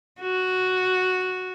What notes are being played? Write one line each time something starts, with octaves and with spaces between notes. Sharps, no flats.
F#4